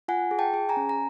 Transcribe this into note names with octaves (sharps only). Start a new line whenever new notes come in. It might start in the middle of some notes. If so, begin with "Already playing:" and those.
F4 F#5 G#5
G#4
G5 A5
G#4
G#5 A#5
C#4
A#5